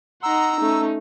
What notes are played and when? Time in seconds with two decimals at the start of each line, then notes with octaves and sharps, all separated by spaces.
0.23 D#4 F#5 A#5 C6 E6
0.60 A3 C#4 D#4